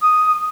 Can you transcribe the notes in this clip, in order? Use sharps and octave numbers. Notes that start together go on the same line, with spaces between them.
D#6